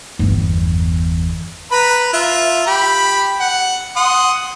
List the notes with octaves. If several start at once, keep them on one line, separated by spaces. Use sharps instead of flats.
G1 E2
B4 A#5 B5
F4 E5
G4 B5
F#5
F#5 C6 D#6